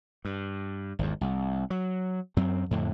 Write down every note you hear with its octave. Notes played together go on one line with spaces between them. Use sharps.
G2
G#1 E2
C2
F#3
F#2 F#3 C4
F2 A2 D3